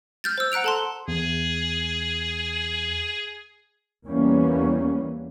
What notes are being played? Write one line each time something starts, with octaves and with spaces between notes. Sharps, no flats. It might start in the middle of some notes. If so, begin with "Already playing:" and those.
F6 G6 A6
C5 E6
F#5 A#5 F#6 D7 F7
A4 A5 C6
E2 G#4
E2 E3 G3 A#3 B3 C#4